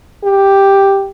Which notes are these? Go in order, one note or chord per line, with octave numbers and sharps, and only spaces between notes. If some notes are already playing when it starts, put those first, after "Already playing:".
G4